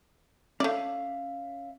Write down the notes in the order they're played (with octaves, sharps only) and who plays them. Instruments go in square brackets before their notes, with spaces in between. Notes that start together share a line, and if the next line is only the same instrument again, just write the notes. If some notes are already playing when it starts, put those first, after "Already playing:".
[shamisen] A3 D5 [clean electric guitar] C#4 E5 F5